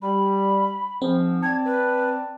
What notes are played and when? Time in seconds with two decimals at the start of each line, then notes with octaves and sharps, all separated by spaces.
0.02 G3 B5
1.02 G#2 F3 C4
1.43 D5 G5 A5 G#6
1.65 B4